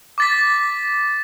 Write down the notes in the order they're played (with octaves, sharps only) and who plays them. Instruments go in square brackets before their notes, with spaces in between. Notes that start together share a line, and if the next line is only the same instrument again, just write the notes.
[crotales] D6 A6 B6